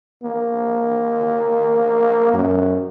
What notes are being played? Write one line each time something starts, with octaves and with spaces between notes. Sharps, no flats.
A#3
F#2